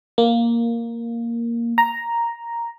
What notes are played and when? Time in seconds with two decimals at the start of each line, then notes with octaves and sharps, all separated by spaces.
0.18 A#3
1.78 A#5